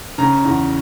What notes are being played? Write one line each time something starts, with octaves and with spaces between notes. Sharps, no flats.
C#3 A#5
E2